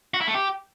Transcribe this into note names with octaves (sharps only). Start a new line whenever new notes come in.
F#4
E4
A3
G4